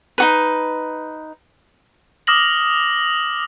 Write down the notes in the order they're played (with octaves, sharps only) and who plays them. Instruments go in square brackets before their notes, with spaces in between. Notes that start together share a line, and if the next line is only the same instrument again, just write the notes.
[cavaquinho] D#4 F#4 B4
[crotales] D6 D#6 F6 A#6 F#7